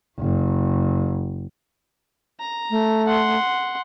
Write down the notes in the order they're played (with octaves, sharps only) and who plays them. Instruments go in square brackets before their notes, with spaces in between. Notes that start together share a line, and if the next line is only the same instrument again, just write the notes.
[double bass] F#1
[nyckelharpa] A#5
[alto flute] A3
[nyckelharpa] F#5 C6